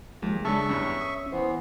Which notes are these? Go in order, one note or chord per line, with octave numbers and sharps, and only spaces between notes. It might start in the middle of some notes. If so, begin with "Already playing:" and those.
D#2 F3 G#3
C#3 G#3 A3 D4 E5 A5 C#6
E2 G2 C#4
D#6
E3 B3 C5